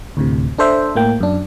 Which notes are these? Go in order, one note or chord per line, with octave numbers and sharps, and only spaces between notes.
D2 A2 C3
D4 A4 C5 E5
A2 A#3 G5
F#2 D4